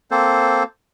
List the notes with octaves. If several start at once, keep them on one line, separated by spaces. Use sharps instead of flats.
A#3 C4 A4 C5